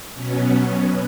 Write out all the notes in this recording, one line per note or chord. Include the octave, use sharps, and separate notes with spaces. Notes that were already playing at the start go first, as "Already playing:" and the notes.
B2 F#3 B3 C#4